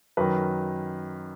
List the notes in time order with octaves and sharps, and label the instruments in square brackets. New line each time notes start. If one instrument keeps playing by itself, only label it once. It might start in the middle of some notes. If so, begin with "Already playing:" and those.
[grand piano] F#2 D#3 B4